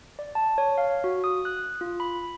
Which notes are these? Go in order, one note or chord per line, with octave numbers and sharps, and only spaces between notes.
D5
A5
C#5
F5
F#4
D#6
F#6
F4
B5